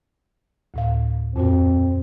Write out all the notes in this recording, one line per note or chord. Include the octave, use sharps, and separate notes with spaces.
D2 A2 F5
F2 A#2 C4 F#4